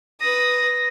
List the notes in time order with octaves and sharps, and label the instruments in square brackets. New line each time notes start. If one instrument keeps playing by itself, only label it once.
[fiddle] B4 D#6 [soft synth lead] A#6